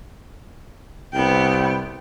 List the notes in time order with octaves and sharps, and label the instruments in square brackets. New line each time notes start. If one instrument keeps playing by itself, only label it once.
[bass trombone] C2 [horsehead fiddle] B3 G5